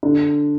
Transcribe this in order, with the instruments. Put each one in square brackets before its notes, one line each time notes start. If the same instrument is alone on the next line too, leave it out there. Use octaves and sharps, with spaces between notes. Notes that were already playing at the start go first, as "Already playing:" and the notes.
[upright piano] D3